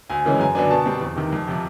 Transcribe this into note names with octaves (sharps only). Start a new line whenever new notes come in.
D2 G#5
C#3 E3 G#3 C#4
F#2 G#5
D3 F#3 B3 D4 G#5
B2 A5
G3 C4
E2
C3 D#3
F2
C3 F3